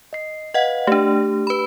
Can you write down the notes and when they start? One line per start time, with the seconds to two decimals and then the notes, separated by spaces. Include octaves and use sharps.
0.13 D#5 C7
0.54 B4 D#5 F5 F#5
0.87 A3 D4 G4
1.47 B4 B5